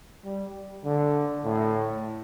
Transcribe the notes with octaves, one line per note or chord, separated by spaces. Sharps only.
G3
D3
A2